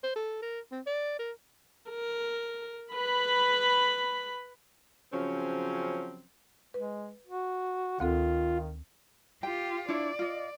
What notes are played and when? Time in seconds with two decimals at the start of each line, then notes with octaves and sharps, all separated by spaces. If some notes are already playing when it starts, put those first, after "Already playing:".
0.03 C5
0.16 A4
0.42 A#4
0.72 C4
0.86 D5
1.19 A#4
1.90 A#4
2.94 B4 B5
5.13 C#3 F3 F#3 C4 C#4
6.74 G#3 B4
7.27 F#4
8.00 D2 D#3 C4 F4 A4
9.43 F4 G4 G5
9.89 D4 E4 C#5 D5
10.19 F4 D#5